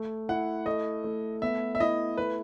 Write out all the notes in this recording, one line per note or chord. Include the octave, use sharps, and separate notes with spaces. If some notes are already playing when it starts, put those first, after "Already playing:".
Already playing: A3
E4 F#5
A3 D#5
A3
B3 E5
E5
E4 D#5
A3 B4